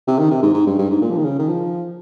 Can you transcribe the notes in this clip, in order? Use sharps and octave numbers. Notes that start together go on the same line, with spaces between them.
C3
D#3
C3
G#2
G#2
G2
G2
G#2
A#2
F3
D#3
C#3
D#3
F3